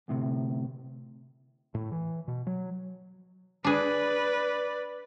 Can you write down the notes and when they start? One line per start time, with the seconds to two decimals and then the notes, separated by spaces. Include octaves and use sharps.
0.08 D2 A2 C3
1.75 A2
1.92 E3
2.28 B2
2.47 F#3
3.64 D4 G#4 B4 D5